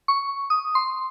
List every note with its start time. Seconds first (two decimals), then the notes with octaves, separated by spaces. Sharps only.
0.08 C#6
0.50 D#6
0.75 C6